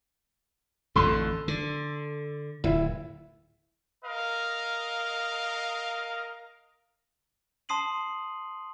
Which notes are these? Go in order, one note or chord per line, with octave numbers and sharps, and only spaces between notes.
A1 F2 D3 A4 C6
D3
D1 E4
A#4 D#5 F5
A5 C6 D#6 C7 D#7 F#7